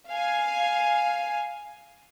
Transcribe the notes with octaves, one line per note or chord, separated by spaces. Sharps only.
F5 G#5